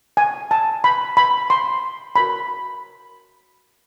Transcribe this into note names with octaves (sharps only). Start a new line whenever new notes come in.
G#5
A5
B5
B5
C6
F#4 A#4 C#5 B5